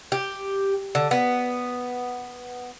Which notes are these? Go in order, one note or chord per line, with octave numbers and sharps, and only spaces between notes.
G4
D3
B3